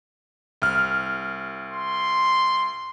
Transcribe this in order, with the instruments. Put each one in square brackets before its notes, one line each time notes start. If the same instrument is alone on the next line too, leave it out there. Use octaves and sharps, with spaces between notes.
[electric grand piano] C2 F6
[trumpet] C6